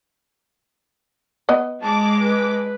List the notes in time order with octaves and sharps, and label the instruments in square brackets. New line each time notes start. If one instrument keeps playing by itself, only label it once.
[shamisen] B3 D#5
[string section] G#3 D6 [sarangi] A5
[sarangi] B4